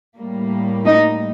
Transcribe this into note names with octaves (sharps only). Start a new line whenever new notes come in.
A2 G3 A#3
D#4